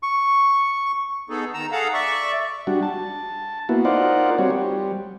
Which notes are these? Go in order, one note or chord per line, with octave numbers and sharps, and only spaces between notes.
C#6
B3 D#4 G#4 A4
D#3 A#5 E6
G#4 A4 F5 F#5 A#5
D5 E5 C#6
G3 D4 F#4
A5
A#3 B3 E4 F#4
D#4 F4 A#4 C5 D5 F#5
G3 C4 F#4 C#5
G3